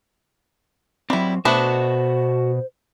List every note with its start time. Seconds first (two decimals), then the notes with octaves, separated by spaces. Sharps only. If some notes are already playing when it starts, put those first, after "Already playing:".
1.10 F#3 G3 C4 E4
1.45 B2 A3 B3 D4 F#4 C5 F#5